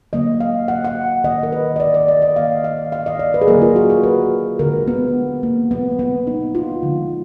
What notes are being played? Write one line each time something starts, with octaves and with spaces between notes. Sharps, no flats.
D3 F#3 A#3 D#5
F5
F#5
F#5
D#3 A#3 D#5
A#4
B4
D#5
D5
D5
D5
D#5
D#3 A#3 F5
F5
F5
D#5
D5
B4
G#4
D3 F#3 A#3 A#4
F4
F#4
A#4
B4
D3 G#3 A#4
B3
A#3
B2 F#3 A#3 B3
B3
D#4
F4
D3 F3 G#3